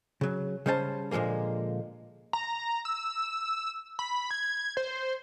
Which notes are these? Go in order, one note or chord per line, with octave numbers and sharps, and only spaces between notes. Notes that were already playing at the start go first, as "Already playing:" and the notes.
C#3 F#3
C#3 G3 C#4 C5 F5 A5
A#2 D3 F3 G#3 A#3
A#5
E6
B5
G#6
C5